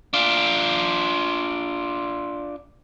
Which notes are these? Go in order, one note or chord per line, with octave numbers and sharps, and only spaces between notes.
D4 F4